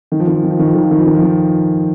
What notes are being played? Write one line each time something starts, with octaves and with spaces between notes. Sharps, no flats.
D#3
F3
D#3
F3
D#3
F3
D#3
F3
D#3
F3
D#3
F3
D#3
F3
D#3